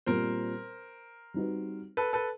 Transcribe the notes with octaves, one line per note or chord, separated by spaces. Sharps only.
A#2 G3 C4 A#4 C5
G3 C4 D#4 F#4 B4
A4 B4
A4 B4